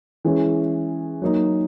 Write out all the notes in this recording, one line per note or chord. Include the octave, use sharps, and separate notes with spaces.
E3 G#3 C#4
F#3 A#3 D#4